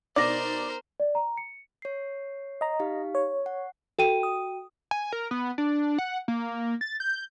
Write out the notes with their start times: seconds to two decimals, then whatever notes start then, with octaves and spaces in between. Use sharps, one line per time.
0.16 B2 D#4 A#4 C5 D5 D6 A#6
1.00 D5
1.15 A#5
1.37 C#7
1.82 C#5 C7
2.61 D#5 A#5
2.80 D#4 G4 F5
3.15 C#5
3.46 F#5
3.99 F#4 A4 G5 D#7
4.23 D#6
4.91 G#5
5.13 A#4
5.31 B3
5.58 D4
5.98 F#5
6.28 A#3
6.81 A6
7.00 G6